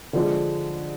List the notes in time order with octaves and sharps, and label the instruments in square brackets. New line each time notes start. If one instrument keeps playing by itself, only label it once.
[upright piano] D3 F3 G#3